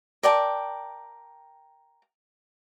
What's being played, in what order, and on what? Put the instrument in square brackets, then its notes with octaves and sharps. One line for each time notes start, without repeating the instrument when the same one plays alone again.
[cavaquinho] A#4 D5 G5 A5